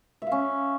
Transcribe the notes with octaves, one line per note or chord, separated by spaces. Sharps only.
C#4 E5 F5